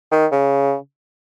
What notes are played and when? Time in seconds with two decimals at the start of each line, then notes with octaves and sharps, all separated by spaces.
0.12 D#3
0.32 C#3